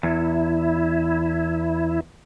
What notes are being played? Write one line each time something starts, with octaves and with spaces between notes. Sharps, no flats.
E2 E4